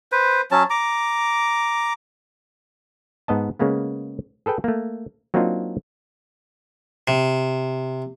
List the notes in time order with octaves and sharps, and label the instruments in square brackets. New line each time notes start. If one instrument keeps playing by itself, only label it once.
[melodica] B4 C5
F#3 C#4 A5
A#5 D6
[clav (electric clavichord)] G#2 B3 D#5 A5
C#3 G#3 A#3 B3
G#4 A4 B4 G5
A3 A#3
F#3 A#3 C4 D4 D#4 F4
[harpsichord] C3